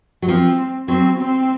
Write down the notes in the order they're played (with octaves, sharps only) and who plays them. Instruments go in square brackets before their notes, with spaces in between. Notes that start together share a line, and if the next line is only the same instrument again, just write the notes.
[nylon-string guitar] F#3
[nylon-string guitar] F3 [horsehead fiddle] C4
[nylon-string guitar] F#3 [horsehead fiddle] C4
[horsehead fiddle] C4